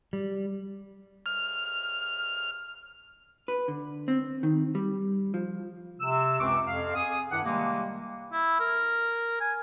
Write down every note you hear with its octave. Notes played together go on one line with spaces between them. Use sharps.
G3
F6
B4
D3
C4
D#3
G3
F3
C3 E6
C#2 F#2 C4 B4 C#6 D6
F2 F5
G#4 D#6
G2 D#3 D4 E4 F#5
C3 D#3 G3 G#3 A#3
E4
A#4
G#5